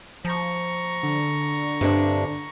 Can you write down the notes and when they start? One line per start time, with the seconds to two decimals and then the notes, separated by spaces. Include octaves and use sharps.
0.25 F3 A#5 C#6
1.03 D3
1.81 G2 C3 D4